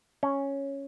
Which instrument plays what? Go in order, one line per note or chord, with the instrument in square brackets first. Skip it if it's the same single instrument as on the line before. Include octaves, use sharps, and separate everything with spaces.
[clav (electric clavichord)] C#4